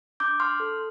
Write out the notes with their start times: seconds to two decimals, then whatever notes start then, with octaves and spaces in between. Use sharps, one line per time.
0.20 D4 D6 G6
0.40 C6 F6
0.60 A4